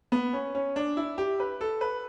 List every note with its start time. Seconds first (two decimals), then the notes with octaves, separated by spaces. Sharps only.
0.12 B3
0.33 C#4
0.55 C#4
0.76 D4
0.97 E4
1.18 G4
1.40 B4
1.61 A4
1.81 B4